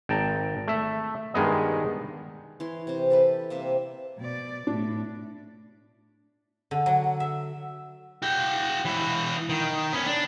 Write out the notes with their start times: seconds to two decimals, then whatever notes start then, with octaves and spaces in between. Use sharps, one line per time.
0.09 G#1 G5 A5 A#5
0.68 A3 E5
1.34 G2 D#3 G#3 B3 D#5
2.60 E3 C#5 C6
2.87 C3 C5
3.10 G4 A4 B4
3.50 C3 A#3 E5
4.18 B2 D5
4.67 A2 D4
6.71 D3
6.86 F#3
7.20 E5
8.22 F#4 G5
8.85 E3 F#4
9.49 D#3
9.93 B3 C#4
10.06 D4